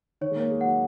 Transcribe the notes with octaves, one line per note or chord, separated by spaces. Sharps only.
D#3 C#5
G#3
A#3 C#5
G#3
F#3 F#5